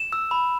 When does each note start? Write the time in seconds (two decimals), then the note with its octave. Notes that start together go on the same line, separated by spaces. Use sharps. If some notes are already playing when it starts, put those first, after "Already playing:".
Already playing: E7
0.13 E6
0.31 B5